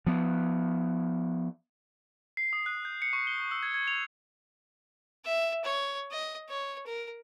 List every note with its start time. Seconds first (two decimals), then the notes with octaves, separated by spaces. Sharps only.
0.07 F3 B3
2.37 C7
2.53 D#6
2.66 F#6
2.85 G6
3.02 C#7
3.13 C#6
3.27 G7
3.51 E6
3.63 G#6
3.74 G#6
3.87 F7
5.25 E5
5.64 C#5
6.12 D#5
6.49 C#5
6.87 A#4